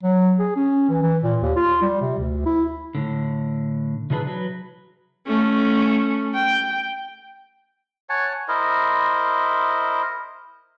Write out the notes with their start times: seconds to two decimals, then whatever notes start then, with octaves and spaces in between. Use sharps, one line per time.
0.03 F#3
0.39 G#4
0.56 C#4
0.89 E3
1.02 E3
1.23 A#2
1.42 D#2
1.56 F4
1.82 G3
2.01 C3
2.19 D2
2.45 E4
2.95 A2 D3
4.10 C3 E3 D4 G#4 B4
4.27 F#3 B4
5.27 A3 C#4
6.34 G5
8.09 C#5 F#5 G#5 A5
8.48 E4 A#4 C5 D#5